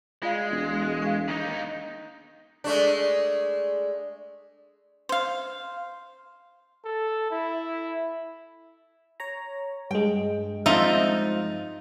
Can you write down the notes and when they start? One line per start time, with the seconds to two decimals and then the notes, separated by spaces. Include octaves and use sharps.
0.22 G#3 F4 D5 F5
0.51 E1
1.02 F5 C#6
1.28 D#2 D#4
2.64 G#3 A3 D4
5.09 C5 F5
6.85 A4
7.31 E4
9.20 C#5 A#5
9.91 G2 G#3 G5
10.66 F3 C4 D#4 F4 E5 A#5